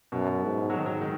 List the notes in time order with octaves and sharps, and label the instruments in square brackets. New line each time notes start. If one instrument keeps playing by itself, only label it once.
[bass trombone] F#2 [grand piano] B2
[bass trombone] G#2
[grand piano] F#3
[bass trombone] G#2 [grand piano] D#3
[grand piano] F#3
D#3